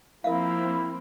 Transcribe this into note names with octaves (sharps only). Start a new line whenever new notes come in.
F3 A#3 C4 E4 A#4 E5 F5